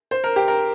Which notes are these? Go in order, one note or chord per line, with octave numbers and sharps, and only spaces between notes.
C5
A#4
G4
A#4